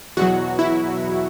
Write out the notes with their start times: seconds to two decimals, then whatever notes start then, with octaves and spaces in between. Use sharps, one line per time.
0.17 E2 B2 F#3 F#4
0.59 E4